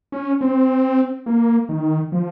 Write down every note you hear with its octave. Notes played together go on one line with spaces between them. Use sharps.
C#4
C4
A#3
D#3
F3